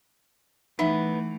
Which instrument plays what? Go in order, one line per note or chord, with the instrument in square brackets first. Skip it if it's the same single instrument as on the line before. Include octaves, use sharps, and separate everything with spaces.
[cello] E3 A3 [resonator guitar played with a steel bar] B3 [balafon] D#4 E5